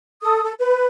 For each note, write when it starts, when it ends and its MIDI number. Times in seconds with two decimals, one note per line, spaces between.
0.22 0.42 69
0.22 0.42 87
0.42 0.52 69
0.57 0.86 71